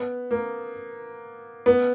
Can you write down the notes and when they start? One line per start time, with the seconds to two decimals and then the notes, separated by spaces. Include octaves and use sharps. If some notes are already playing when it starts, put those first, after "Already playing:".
Already playing: B3
0.31 A#3
1.66 B3